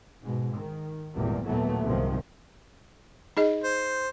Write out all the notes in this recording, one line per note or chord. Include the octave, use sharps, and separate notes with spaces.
G#2 B2
D#3
G#1 E2 A#2 G3
D#2 A#2 E3 F#3 A3 B3
C2 G#2 C3 D#3 F3
D#4 G#4 D#5
C5